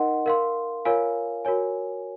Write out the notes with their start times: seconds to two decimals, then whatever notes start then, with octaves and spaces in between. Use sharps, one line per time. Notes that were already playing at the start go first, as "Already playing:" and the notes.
Already playing: D#4 A#4 D#5 F#5 C6
0.26 A#4 F5 C6
0.85 F4 A#4 C#5 F5 G#5
1.45 F#4 A#4 C#5 G#5